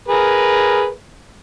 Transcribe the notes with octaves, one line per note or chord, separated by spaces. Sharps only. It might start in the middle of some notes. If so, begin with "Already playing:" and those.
G#4 A#4 B4